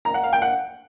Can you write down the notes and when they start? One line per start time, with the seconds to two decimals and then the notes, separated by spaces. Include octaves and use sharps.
0.05 A#5
0.14 F#5
0.23 F5
0.33 G5
0.42 F#5